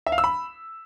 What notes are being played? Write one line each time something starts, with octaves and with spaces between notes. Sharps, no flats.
E5
F5
E6
B5